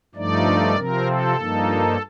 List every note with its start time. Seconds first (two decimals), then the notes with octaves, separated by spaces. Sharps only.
0.15 G2 F3 A3 D#4 D5
0.75 C3 F3 C4 A#4
1.06 A4
1.36 G2 F3 A#3 D#4